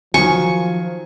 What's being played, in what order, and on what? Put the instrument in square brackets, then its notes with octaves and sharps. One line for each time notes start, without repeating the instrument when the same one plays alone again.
[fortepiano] D#3 F#3 [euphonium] F3 [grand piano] G#5 [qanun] C#6